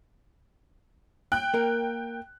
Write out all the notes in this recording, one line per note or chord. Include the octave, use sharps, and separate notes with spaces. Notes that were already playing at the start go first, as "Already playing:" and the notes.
G5 F#6
A#3 A#4